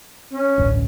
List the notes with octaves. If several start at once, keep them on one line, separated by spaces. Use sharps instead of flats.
C#4
A1 D2 G2